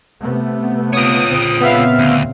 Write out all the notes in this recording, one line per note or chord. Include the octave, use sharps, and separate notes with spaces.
C3 A3 B3
F4 C#5 D#6 D7
A#2 C#3 C4
B3 E5 F5
D2